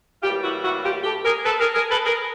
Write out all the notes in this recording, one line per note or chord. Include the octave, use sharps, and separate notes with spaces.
A2 E3 G3 A#3 F4 G4
E4 F#4
E4 F#4
F4 G4
G4 A4
G#4 A#4
A4 B4
G#4 A#4
G#4 A#4
A4 B4
G#4 A#4